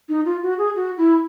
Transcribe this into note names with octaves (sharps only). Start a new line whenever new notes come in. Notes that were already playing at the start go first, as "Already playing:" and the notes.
D#4
F4
F#4
G#4
F#4
E4